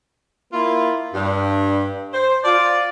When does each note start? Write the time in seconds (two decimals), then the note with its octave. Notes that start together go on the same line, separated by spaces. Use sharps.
0.53 A#3 E4 F4
1.14 G2
2.13 C5
2.45 F4 D5